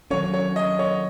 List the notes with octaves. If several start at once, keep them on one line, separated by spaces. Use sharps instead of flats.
D#3 F#3 C#4 C#5
C#5
D#5
C#5